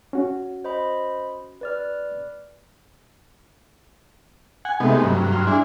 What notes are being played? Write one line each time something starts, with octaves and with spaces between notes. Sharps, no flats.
C#4 F#4
C5 D#5 B5
B4 D5 F6
F#5 G#5
C3 G#3 A3 B3 D#4
G2 F#3
C6 F6
D4 E4 G#4